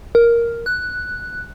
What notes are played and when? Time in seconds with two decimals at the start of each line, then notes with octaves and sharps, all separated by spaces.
0.15 A#4
0.66 F#6